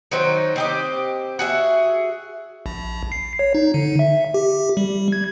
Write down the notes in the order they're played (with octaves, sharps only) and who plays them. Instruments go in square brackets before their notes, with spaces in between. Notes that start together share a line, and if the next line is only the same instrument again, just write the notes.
[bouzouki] D#3 F#3 D#4 C5
C4 G4 D#5
F#4 G#4 E5
[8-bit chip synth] A#1
C7
C#5
D#4
D3
E5
G4
G3
G#6